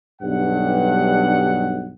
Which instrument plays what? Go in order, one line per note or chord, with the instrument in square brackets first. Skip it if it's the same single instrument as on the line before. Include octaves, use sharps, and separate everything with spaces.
[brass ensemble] B1 G2 F#5